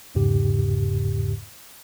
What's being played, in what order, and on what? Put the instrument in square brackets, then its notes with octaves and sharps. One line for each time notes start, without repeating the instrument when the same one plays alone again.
[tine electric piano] B1 E2 G#2 C#3 G4